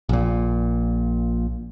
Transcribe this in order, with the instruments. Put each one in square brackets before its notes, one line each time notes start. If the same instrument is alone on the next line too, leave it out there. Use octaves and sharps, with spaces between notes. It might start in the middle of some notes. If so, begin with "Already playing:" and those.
[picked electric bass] A#1 A#2